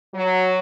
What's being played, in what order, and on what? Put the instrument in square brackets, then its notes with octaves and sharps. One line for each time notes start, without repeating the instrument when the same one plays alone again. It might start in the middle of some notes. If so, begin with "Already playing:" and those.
[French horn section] F#3